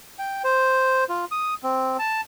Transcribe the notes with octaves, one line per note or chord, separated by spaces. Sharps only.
G5
C5
F4
D#6
C4
A5